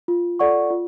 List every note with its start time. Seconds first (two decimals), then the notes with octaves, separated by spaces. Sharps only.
0.08 F4
0.39 A4 D5 F#5 C#6
0.70 F4